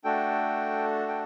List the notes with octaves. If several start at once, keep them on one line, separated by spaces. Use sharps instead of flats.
A3 D4 F#4 A4 G5
G5